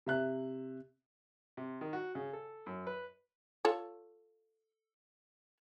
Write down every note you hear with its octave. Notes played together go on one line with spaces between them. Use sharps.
C3 E5 F#6
C3
D#3
F#4
C#3
A4
F#2
B4
F4 A4 C#5